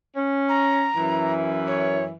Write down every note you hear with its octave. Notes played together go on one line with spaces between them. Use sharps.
C#4
A#5
F#2 E3
C#5